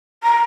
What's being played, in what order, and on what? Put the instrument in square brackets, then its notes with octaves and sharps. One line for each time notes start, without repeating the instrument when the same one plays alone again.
[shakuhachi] A#5